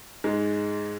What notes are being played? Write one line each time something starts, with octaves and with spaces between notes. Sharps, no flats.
G#2 G#3